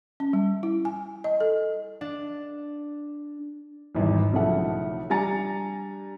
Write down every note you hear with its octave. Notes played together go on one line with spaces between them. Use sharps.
C#4
G3
E4
G#5
D#5
A4
D4
G#1 E2 G2
B1 C#3 E3 F3 A3 F#5
G3 D4 G#5 A#5 A6 C#7